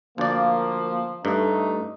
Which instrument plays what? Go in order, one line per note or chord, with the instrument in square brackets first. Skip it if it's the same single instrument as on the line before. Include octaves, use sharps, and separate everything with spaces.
[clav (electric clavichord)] D2 D5 [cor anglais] F3 [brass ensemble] A#3
[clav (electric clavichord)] G2 [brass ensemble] A3 [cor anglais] D#4